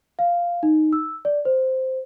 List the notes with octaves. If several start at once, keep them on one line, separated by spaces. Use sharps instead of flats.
F5
D#4
E6
D5
C5